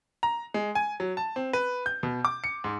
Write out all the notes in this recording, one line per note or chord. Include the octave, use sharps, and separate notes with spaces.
A#5
G#3
G#5
F#3
A5
C4
B4
G6
B2
D6
C#7
G#2